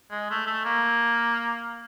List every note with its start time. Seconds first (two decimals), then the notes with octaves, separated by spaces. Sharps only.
0.11 G#3
0.31 A3
0.47 A3
0.65 A#3